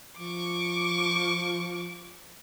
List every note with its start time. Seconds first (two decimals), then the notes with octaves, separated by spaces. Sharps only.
0.19 F3 C#6 D6